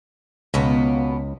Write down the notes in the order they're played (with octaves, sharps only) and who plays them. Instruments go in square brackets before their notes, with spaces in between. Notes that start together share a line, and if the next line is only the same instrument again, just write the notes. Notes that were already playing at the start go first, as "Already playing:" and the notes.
[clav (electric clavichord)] C#2 [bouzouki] B2 A#3 B3